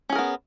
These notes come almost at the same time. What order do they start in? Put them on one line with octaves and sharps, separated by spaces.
C#4 G#4 A#4 B3